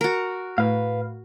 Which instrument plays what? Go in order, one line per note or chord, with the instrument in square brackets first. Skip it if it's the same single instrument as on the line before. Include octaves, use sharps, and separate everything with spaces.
[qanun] F#4 A#4
[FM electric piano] A2 [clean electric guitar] B4 F5